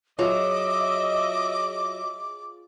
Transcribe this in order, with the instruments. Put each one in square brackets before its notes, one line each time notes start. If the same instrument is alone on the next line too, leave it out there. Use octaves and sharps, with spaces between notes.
[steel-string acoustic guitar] F#3 [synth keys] F4 G#4 [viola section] D#5 E5 [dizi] D6